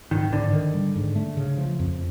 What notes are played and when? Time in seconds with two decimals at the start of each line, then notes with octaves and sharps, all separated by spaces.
0.11 G#2 D#3
0.32 G#2 D3
0.53 D#3
0.74 G3
0.96 G#2
1.15 A3
1.37 C#3
1.57 F3
1.79 F2